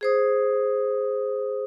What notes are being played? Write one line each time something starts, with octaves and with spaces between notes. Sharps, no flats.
G#4 C5 D#6